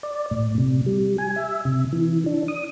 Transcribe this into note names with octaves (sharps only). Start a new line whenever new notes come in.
D5
A2
C3
G3
G#5
E5
C3
E3
D4
D#6